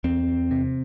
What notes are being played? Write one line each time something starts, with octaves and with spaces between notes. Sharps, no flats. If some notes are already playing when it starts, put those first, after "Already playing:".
E2 C4
C3